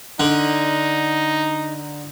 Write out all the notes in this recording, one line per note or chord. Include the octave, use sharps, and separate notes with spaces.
D3 D#4